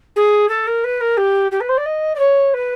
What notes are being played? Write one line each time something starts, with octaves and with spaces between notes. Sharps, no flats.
G#4
A4
A#4
B4
A#4
G4
G4
B4
C5
D5
D#5
D5
C#5
B4